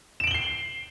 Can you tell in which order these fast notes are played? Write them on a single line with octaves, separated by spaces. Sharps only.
E7 D7 F#7 G7 C7